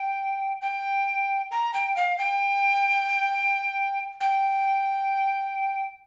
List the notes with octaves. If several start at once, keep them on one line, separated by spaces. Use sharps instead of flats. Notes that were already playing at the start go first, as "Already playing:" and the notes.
Already playing: G5
G5
A#5
G5
F5
G5
G5